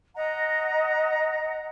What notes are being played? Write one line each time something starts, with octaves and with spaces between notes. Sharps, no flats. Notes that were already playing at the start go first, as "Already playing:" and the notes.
D#5 F#5 A#5